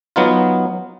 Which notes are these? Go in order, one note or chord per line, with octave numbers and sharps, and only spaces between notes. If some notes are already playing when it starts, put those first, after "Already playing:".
F#3 B3 D#4 F4